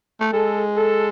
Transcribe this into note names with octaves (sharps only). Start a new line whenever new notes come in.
A3
G#3 A4
A4